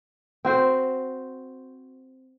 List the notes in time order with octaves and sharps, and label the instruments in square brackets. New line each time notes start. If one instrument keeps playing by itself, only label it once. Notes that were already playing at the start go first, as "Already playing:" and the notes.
[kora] C4 F#4 C5